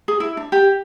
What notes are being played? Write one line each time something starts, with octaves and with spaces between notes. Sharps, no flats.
G#4
E4
D4
G4